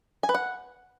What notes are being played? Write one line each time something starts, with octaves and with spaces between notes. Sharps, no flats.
G#5
B4
F#5